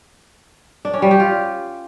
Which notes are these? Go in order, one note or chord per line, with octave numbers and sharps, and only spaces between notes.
D4
C#4
G3
G4
F4